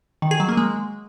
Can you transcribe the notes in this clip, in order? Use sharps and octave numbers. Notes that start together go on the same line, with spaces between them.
D#3
G#4
F#3
A#3
G#3